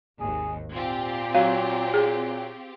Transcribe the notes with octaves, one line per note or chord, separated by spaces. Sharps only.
G#1 D#2 G#4
A#2 C4 F4 G4
F#3 F5
G#4